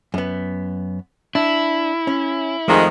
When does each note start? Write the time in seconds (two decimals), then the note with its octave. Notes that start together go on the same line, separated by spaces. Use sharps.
0.14 F#2 B3
1.35 D4 E4
2.07 C#4
2.68 F2 D#3 F3 G#3 A3 D5